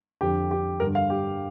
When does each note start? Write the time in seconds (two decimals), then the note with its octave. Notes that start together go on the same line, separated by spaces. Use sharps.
0.21 F2 D3 G4
0.51 G4
0.80 G2 D3 A#4
0.95 F5
1.10 G4